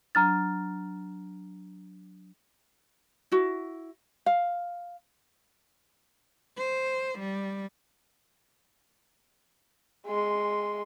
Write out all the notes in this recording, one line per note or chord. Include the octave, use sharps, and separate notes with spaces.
F#3 D4 A#5 F6 A6
E4 F#4
F5
C5
G3
G#3 C6